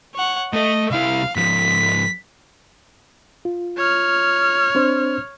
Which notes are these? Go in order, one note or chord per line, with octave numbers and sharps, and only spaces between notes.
C#5 F#5
A3 A4 D#5
C2 E4 F5
G#2 F3 B6
F4
C#5 F6
C4 D4 C5